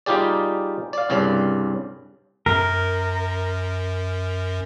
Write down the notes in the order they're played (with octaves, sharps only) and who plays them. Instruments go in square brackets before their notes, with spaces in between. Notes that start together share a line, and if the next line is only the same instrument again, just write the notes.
[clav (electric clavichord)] G3 D#4 F4 G4 G#4 D5
D5 F5
C2 G2 C#3 D5
[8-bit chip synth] F#2 [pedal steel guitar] A#4